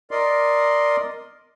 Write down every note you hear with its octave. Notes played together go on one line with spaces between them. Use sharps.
A#4 D5 D#5 C6